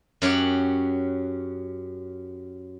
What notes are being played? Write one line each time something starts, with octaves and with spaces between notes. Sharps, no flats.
F#2 C#4 G4 F#5